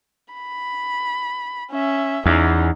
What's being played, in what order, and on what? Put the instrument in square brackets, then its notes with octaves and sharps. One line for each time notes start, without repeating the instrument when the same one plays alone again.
[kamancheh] B5
C#4 E5
[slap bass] E2 [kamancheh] C#4 D#4